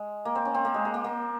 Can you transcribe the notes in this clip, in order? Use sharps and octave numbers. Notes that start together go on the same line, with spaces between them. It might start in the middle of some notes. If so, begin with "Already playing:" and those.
Already playing: G#3
A#3
C4
C#4
C4
A#3
G#3
G#3
A#3
A#3